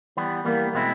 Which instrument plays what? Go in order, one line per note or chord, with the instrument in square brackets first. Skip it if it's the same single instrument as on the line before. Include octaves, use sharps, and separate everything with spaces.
[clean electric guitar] E3 G3 B3
[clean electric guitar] E3 G3 B3 [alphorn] A#3
[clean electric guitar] B2 G#3 C4 E4